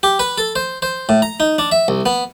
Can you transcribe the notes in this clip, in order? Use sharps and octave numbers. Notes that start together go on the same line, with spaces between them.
G4
B4
A4
C5
C5
A2
A#5
D#4
D4
E5
C2
B3